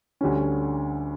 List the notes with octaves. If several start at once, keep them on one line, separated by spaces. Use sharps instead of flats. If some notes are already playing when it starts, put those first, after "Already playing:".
D2 D3 G3 C#4